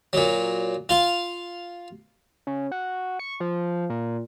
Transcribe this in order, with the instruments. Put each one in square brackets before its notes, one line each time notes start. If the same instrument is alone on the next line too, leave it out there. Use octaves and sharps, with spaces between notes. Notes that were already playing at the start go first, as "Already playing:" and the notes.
[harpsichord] A#2 F#3
F4 F5
[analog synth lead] C#3
F#4
C#6
F3
A#2